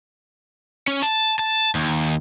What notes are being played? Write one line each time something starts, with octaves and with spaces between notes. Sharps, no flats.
C#4
A5
A5
D#2